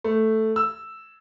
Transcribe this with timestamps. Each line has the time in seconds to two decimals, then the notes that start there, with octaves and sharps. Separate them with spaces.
0.04 A3
0.56 E6